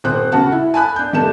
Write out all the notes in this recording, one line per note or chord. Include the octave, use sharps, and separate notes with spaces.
D#1 C4 C5 F#6
C#3 F#4 F#5 A5
E4
G#5 A5 B5 F#6
D4 G6
D#3 G3 A3 A5 E7